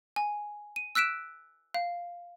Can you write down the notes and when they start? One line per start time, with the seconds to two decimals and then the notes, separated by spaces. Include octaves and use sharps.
0.16 G#5
0.76 D#7
0.95 E6 F#6 B6 D7 E7
1.74 F5